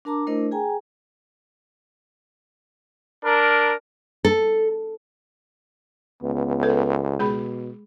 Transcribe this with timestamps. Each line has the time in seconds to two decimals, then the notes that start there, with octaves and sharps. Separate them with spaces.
0.05 D4 A#4 A5 A#5 D6
0.27 A3 D4 E4 A#4 C5 D#5
0.51 G#4 G5 G#5 A#5
3.23 D4 A#4
4.25 A4
6.23 C#2 B3
6.63 A4 B4
7.19 B2 G#3 G#4 B5